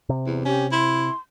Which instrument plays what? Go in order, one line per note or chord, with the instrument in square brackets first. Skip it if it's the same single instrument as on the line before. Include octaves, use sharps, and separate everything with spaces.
[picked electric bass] C3
[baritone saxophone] E2
[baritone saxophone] C#4 [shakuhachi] G4
[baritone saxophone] E4 [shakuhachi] C6